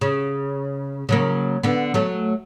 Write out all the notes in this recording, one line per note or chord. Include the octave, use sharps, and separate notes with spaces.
C#3
C#3 F#3 A#3
D3 B3
F#3 A3